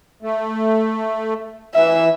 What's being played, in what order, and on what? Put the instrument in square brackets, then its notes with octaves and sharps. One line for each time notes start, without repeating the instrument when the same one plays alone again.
[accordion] A3
[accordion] E3 [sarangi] E5